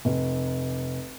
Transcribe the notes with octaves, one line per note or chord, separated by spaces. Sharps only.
F1